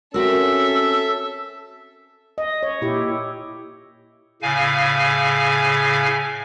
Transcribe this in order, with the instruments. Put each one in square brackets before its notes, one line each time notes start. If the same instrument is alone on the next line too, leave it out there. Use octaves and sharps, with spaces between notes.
[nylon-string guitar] C4 F#4 A#4 [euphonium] C#4 [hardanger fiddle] A4 E5 [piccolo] E6
[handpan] D#5
C#5
A#2 E4 G4
[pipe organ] A2 C#3 F5 G#5